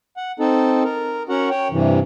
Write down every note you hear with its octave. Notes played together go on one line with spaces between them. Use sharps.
F#5
C4 D#4 A4
A#4
C#4 F#4 A#4 F#5
C#5 G5
G2 C3 E3